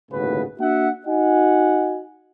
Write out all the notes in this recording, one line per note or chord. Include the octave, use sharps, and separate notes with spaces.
G1 D#2 A2 C#3 F#4 B4
A#3 D4 F#4 E5 F#5
D#4 F#4 D#5 F#5 G#5